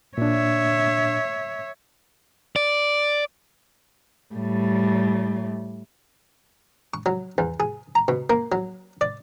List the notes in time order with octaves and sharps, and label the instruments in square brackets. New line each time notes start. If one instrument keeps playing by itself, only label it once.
[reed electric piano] A#2 D4 [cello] C#5 E5
[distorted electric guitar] D5
[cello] A2 G3
[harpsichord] C#6
F#3
E2
G#4
A#5
B2
A#3
F#3
D5